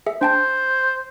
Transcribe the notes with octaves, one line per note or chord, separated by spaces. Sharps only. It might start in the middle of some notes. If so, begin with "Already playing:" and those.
G#4 E5
D4 C5 G5 A5